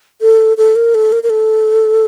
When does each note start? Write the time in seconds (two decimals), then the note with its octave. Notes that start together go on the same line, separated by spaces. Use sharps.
0.21 A4
0.57 A4
0.76 A#4
0.95 A4
1.12 A#4
1.23 A#4
1.30 A4